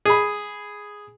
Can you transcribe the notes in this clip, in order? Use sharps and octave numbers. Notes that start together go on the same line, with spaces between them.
G#4 B5